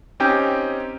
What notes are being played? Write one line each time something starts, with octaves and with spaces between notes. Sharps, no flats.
C4 C#4 D#4 G4 G5